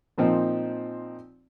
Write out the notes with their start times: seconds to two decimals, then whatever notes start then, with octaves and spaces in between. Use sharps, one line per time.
0.18 A#2 F3 C4 D#4